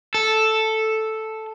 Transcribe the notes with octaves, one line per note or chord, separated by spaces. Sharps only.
A4